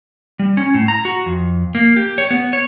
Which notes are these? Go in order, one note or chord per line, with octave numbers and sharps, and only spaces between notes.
G3
C#4
A2
A#5
F#4
F2
A#3
G4
C#5
B3
C#5